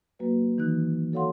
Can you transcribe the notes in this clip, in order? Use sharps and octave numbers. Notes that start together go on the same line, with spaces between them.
F#3 A#3 F#4 B4
D#3 E3 D#4 F#6
F#4 A4 C#5 F5 F#5 C6